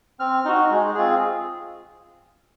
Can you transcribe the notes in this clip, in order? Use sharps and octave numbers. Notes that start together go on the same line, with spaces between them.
C4 F6
D#4 F#4
G#3
C4 F4 G#4